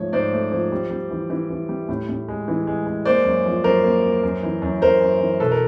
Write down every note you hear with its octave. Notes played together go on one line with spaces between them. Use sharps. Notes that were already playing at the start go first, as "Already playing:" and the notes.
Already playing: G#2 F3 A3 C#5
G#2 C5 D5
A3
F3
G3
G3
E3
E3
E3
G3
A2
A2
G#3
E3
G#3
G#3
A#3 C5 D5
F#2
F3
F#2 A#4 C5
A#3
F#2
F#2
E3
F#2
F#2 A#4 C5
F#2
E3
B2 A4 B4
A#4